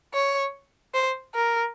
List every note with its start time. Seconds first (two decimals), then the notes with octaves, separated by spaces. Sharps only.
0.14 C#5
0.94 C5
1.35 A#4